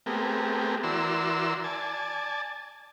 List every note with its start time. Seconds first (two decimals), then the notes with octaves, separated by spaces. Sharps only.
0.06 A3 B3 C4 G4 G#4 A#4
0.83 E3 F#4 A#4 D5 C6 E6
1.64 D5 G#5 A5